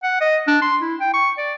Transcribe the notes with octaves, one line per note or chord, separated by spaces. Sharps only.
F#5
D#5
D4
C6
E4
G5
C#6
D5